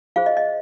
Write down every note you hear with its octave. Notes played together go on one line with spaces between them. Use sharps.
F4 G#4 C5 F5
D#5
D#5